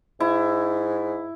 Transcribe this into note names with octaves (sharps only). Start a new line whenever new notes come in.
G#2 E4